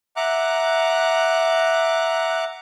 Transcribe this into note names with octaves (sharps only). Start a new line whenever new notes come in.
E5 F#5 A#5 D6 F#6